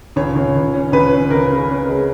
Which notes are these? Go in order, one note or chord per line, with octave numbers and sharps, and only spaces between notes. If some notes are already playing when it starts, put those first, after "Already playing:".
C#2 C#5
C#2
C#2
C#4
C#2 B4
C#4
C#2 A#4
C#3
C#4
G#3